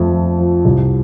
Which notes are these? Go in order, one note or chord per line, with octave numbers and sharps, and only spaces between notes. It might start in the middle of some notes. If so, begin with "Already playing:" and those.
Already playing: F2 A3
F3
F3
C2